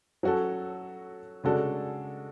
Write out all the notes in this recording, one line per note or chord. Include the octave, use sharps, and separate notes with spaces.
F#3 C#4 F#4 A4
C#3 G#3 D4 F#4 A4